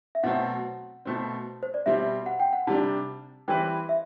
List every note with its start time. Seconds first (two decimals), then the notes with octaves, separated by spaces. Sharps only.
0.15 E5
0.23 B2 F#3 A3 C4 F#5
1.05 B2 A3 C4
1.63 C5
1.74 D5
1.86 B2 G3 C4 E5
2.26 F#5
2.40 G5
2.53 F#5
2.67 C3 G3 D4 A5
3.48 E3 G3 C4 E4 B4 G5
3.89 E5